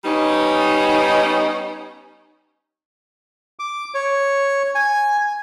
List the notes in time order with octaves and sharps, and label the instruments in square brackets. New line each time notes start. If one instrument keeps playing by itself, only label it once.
[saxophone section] G3 B3 C#4 D#4
[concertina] D6
C#5
G#5